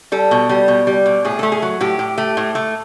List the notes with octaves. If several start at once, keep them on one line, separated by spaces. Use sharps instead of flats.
G3 A4
B2
G3
B2
G3
B2
A2 G#4
A3 A4
G#4
F#3
A2 G4
A2
A3
A2
A3